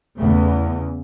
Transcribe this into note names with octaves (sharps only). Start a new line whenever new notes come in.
E2 C#3 A3